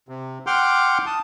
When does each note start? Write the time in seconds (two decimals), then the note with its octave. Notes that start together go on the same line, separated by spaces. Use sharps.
0.09 C3
0.47 F#5 G5 C6 D6 F6 G6
1.06 A5 D#6